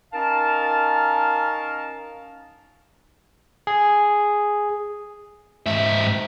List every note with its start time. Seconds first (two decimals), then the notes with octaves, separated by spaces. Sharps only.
0.13 C#4 D#4 A#4 F5 A5
3.67 G#4
5.66 G#2 E5